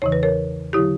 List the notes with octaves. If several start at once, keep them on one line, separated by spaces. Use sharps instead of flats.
E2 C#3 E3 C#5
B4
A#4 C#5
D3 F#3 E4 G4